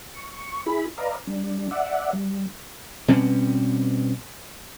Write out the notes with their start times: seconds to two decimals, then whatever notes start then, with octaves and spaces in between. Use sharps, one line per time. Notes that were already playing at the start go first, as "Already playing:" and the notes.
0.15 C#6
0.66 E4 G#4 B5
0.98 B4 D5 D#5 F5 A#5
1.27 G3 D4
1.71 D5 E5 F#5
2.13 G3
3.08 B2 G3 C4 C#4